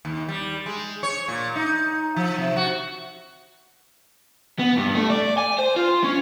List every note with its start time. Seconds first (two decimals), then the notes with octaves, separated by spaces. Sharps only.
0.05 D#2
0.28 G3
0.66 G#3
1.03 C#5
1.28 A#2
1.56 D#4
2.16 F3
2.38 C3
2.56 F#4
4.59 B3
4.77 G2
4.95 A3
5.10 D5
5.38 G#5
5.59 C5
5.76 F4
6.04 C#4